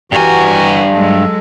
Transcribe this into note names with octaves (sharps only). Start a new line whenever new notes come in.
G2 E3 F#4 G4 A#4 G#5
F#3 G#3 A4